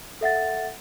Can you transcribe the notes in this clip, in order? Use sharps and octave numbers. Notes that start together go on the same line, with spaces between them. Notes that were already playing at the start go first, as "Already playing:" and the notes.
A4 E5 F#5 A6